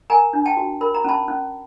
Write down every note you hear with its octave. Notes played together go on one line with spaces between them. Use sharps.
A#4 G#5 A#5
D4
G5 A5
F#4
A#4 B5
A#5
C#4 A5 B5
C#4